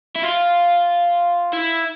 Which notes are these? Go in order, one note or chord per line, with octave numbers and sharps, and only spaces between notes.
E4
F4
E4